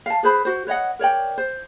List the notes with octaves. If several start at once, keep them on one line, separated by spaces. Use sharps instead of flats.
F5 A5
G#4 B4 C5 B5
F#4 C5
B4 C#5 D#5 F#5
A#4 C#5 D5 G5
C5